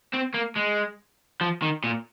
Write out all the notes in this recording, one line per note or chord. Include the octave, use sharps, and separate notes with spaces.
C4
A#3
G#3
F3
D#3
A#2